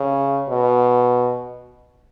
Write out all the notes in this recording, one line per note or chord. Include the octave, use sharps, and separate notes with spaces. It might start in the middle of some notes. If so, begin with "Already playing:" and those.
Already playing: C#3
B2